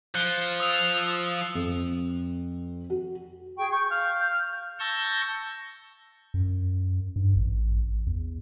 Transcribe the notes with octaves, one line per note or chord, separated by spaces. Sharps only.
F3 F#6 C#7 G7
D#6 E6 F7
D#6
F2
F#4
G#4 G5 C#6
C#6 G6
F5
A5 C#6 E6 G6 A#6
F#2
G2
A1
E2